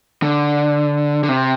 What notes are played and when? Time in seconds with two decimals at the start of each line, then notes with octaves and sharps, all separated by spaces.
0.22 D3
1.23 D3
1.29 C3